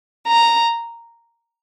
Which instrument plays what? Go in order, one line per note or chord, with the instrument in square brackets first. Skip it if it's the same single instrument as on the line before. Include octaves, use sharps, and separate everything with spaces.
[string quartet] A#5